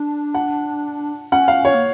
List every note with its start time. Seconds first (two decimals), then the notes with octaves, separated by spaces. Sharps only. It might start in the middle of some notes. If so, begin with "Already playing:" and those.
Already playing: D4
0.34 F#5
1.32 C#4 F#5
1.48 F5
1.65 C#5
1.74 A#3